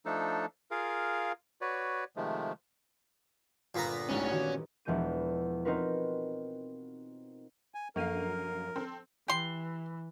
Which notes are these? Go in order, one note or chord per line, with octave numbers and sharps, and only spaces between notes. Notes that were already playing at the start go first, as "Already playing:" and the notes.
F3 A3 D4 D#4 A4
F4 G#4 A#4 F5
F#4 B4 C#5 D5
C3 D#3 F3 G#3 A3
G1 A#2 B3 A4 A#5 C7
D1 C#2 G#2 C#4 E4 A4
D#3 E3 F#4 G4
E1 E2 F3 G#3 G6 D#7
C4 D#4 F4 F#4 A#4 B4
G#5
F#2 F3 A#3 A4 A#4 F5 D#7
C4 A4
E3 G4 C6